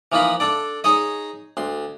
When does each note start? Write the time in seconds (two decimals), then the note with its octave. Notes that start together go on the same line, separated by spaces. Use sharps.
0.12 E3 F3 A#3 D#4 F4 B5
0.40 D4 A4 D5
0.84 D#4 G#4 C#5 D#5
1.57 D2 C6